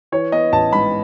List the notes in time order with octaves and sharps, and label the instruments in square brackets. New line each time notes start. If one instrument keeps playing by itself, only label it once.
[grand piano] E3 C#5
B3 D#5
A1 A5
G#2 B5